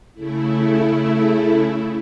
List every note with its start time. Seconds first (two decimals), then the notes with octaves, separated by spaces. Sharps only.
0.14 C#3 A3 E4